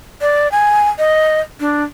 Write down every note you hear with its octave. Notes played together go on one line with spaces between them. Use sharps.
D5
G#5
D#5
D4